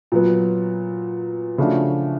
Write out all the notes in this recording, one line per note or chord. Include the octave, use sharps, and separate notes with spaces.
A#2 F#3 B3
C#3 F3 A3 D4 F#4